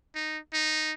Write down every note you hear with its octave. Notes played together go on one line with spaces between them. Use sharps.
D#4
D#4